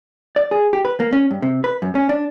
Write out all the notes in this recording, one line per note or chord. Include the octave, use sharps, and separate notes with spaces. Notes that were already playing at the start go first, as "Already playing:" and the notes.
D5
G#4
G4
B4
A#3
C#4
G2
C3
B4
F#2
C#4
D4